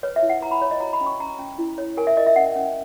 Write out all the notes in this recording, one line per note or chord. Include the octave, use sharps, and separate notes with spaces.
B4 C#5
E5
E4
F#5
B4 A#5
B5
B4 C#5
D#5
F#4 A#5
B5
C#4
C#6
C#4 A#5
C#4
E4
C#5
A#4 G#5
E5
A#4 D#5
E5
C#4 F#5
C#4